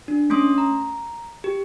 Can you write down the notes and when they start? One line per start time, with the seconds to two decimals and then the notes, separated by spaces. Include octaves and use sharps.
0.08 D4
0.30 A3 C#4 C6 D#6
0.58 A#5
1.44 G4